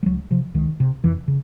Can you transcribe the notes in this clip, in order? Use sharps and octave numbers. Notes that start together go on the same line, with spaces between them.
G3
C#2 F#3
C3 F3
C#2 D#3
C3
F2 E3
C#3